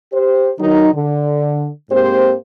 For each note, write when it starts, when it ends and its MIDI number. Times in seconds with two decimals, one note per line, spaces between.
0.13 0.50 67
0.13 0.50 72
0.59 0.92 51
0.59 0.92 54
0.59 0.92 63
0.93 1.68 50
1.90 2.34 44
1.90 2.34 58
1.90 2.34 60
1.90 2.34 67
1.90 2.34 72